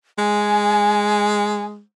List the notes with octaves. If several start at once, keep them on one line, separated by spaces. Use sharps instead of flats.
G#3 G#5